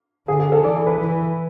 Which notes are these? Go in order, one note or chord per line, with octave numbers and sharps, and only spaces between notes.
D3 G#4
G#4
A4
E3 D5
D5
B4
E3